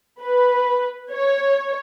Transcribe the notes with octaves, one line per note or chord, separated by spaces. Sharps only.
B4
C#5